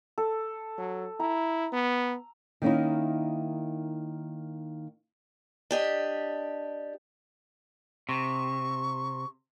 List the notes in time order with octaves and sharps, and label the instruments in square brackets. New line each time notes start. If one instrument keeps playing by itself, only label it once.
[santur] A4
[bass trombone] F#3
[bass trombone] E4 [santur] A#5
[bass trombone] B3
[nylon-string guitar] D#3 A#3 C#4 D#4 E4
[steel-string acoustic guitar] D4 G4 D#5
[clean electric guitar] C3 [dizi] C#6